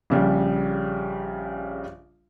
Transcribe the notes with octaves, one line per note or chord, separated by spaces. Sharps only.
A#1 C#3 G3